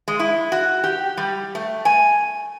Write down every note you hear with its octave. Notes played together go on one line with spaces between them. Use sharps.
G#3
E4
F#4
G4
G3
A3
G#5